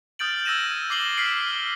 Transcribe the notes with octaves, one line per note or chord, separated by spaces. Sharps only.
D#6 F6 G6 A6 D7 F#7
E6 G#6 A#6 D#7 E7
D6 C7 F#7 G7
F6 B6 C7 D7
F6